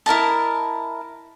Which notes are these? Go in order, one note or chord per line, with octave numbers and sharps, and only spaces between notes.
E4 A#4 D#5 A5